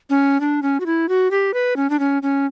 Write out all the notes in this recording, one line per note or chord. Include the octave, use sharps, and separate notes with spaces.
C#4
D4
C#4
F#4
E4
F#4
G4
B4
C#4
D4
C#4
C#4